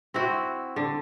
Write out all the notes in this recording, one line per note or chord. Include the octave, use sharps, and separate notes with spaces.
C4 E4 F#4
D3